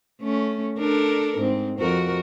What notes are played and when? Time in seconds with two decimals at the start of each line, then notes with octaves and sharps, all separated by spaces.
0.21 A3 C#4
0.79 D4 A4 A#4
1.38 G#2 C4
1.79 F2 F#4 A#4